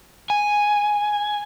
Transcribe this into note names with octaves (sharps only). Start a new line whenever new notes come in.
G#5